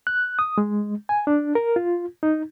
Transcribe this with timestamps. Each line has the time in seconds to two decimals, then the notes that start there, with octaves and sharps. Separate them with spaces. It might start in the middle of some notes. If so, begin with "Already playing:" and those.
0.07 F#6
0.39 D#6
0.58 G#3
1.09 G#5
1.27 D4
1.55 A#4
1.76 F4
2.23 D#4